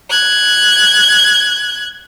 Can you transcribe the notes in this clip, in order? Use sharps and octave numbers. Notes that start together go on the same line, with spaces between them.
F#6 G#6